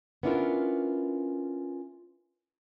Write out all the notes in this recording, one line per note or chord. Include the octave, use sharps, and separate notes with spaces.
B3 C#4 D4 E4 F4 A#4